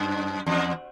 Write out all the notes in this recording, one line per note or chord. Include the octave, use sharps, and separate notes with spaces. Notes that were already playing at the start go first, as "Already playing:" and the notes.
Already playing: F#2
E2